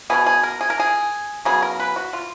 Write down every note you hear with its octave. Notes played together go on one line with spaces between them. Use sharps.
B2 F#3 B3 G#4
G#4
A#4
G#4
A#4
G#4
C#3 F#3 B3 G#4
A#4
B4
F#4
F4